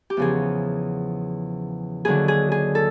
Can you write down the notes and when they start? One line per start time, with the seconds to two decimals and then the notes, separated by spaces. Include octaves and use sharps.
0.10 G4
0.17 E2 C#3 F3 G#4
2.05 D#2 D3 F#3 G#4
2.28 G#4
2.52 G#4
2.75 A4